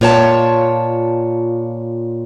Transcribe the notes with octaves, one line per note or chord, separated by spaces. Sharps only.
A#2 F4 C#5 G5 A5